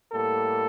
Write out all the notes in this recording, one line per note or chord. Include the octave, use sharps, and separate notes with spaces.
A2 G3 A#3 A4